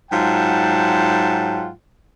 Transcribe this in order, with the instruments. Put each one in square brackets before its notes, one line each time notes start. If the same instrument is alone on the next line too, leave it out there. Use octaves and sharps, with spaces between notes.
[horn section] G#2 F#3 F4 F#5 G5 A5